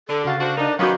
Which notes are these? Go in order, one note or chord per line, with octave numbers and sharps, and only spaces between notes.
D3 A4
C#3 F#4 F5 A6
D4 F#4 C5
D4 D#4 A#4
D#3 F#3 B3 C#4 F#4 F5 D6 G6